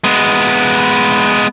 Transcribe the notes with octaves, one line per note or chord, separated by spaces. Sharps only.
G#3 B3